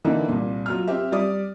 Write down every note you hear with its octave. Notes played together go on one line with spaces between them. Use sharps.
D3 E3 A#3 D#4 E4
C2 A#2
F#3 F4 F6
C4 G4 E5
G3 D5 D#6